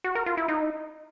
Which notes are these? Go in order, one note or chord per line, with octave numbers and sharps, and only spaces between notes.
F#4
A#4
F4
E4
D#4